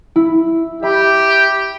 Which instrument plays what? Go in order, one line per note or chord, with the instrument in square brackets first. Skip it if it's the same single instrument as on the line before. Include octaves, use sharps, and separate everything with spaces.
[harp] E4
[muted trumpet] G4 [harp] E5 B5